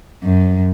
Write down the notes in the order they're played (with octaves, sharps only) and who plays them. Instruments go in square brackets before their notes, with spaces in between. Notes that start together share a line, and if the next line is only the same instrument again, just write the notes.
[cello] F#2